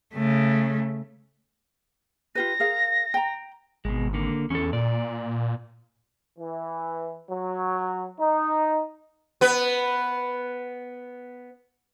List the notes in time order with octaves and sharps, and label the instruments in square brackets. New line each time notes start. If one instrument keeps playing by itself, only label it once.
[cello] C#3 A3
[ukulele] F4 G4 B4 [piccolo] A#6
[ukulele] G#4 A#4 F5
G5 A#5
[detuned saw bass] G#1 [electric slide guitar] B2 G#3
[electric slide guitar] D3 A#3
[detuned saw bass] E2 [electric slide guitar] C#4 A4
[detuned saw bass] A#2 [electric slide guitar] D5
[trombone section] E3
F#3
D#4
[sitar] B3 B4